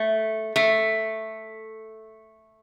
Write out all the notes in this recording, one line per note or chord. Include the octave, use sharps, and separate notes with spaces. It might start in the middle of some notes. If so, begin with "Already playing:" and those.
Already playing: A3
A3